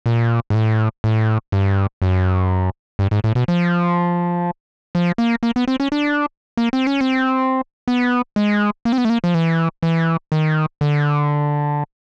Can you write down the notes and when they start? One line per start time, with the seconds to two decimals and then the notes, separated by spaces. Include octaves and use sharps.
0.06 A#2
0.50 G#2
0.55 A2
1.04 A2
1.52 G2
2.02 F#2
2.99 G2
3.11 G#2
3.24 A2
3.35 B2
3.48 F3
4.95 F3
5.18 A#3
5.43 A#3
5.56 B3
5.68 C4
5.80 C#4
5.92 D4
6.57 A#3
6.73 C4
6.87 C#4
7.01 C4
7.88 B3
8.36 G#3
8.85 A#3
8.93 C4
8.98 B3
9.05 A3
9.10 A#3
9.24 F3
9.34 E3
9.83 E3
10.32 D#3
10.81 D3